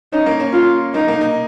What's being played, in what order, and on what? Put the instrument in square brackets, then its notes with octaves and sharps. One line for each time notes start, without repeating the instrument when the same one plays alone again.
[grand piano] C#4 [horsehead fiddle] D#4
[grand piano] A#3
C#4
[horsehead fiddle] F4
[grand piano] A#3 [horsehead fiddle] D#4
[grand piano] A#3
D#4